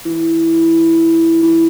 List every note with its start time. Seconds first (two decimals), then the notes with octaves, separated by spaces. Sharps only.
0.05 E3
1.43 E3